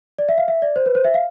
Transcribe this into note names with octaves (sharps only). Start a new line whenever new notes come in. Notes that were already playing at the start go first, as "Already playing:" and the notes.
D5
E5
F5
E5
D5
C5
B4
C5
E5
F5